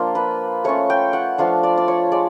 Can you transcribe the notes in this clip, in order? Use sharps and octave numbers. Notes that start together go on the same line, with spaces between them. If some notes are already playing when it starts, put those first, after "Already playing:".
Already playing: F3 A#3 D4 F4
B4
A3 C#4 F4 C#5
G5
F#5
F3 A3 D4 F4 F5
D5
D5
C#5
G#3 D5